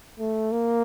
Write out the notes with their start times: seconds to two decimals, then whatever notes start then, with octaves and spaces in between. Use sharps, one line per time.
0.19 A3
0.52 A#3